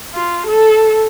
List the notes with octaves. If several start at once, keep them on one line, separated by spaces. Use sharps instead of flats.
F4
A4